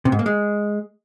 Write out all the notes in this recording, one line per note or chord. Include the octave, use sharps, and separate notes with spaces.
C3
G#2
A#3
G#3